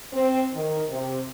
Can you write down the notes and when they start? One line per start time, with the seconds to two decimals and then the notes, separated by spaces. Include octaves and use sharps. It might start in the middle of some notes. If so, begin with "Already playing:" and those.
0.12 C4
0.54 D#3
0.89 C3